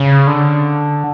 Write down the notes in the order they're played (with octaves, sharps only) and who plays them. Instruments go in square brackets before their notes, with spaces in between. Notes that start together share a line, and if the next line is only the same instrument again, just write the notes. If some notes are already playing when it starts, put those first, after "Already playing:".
Already playing: [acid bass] C#3
D3